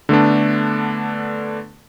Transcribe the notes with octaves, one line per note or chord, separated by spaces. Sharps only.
D3 A3 B3 D4